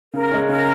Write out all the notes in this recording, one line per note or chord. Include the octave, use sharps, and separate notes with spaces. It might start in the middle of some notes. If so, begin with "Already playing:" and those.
C#3 A#4
G#3 C#4
C#3 A#4